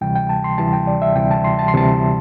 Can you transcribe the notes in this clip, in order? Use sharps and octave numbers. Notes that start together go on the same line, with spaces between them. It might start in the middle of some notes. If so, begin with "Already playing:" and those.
D2 C3 E3 G3 G5
G5
A5
C6
D2 C3 E3 G3 A5
G5
D5
E5
D2 C3 E3 G3 G5
A5
C6
A5
C6
D2 C3 E3 G3 A5